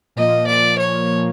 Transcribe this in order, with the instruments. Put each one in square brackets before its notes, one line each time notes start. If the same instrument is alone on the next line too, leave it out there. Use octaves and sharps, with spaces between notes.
[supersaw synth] A#2 F3 A#3 [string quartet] D#5
[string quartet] D5
C#5